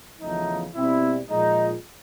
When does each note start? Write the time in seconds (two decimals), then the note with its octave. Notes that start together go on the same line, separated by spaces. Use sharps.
0.20 E2 C#3 F3 A3 D#4
0.74 B2 G3 C4 E4
1.29 A#2 F3 G#3 D#4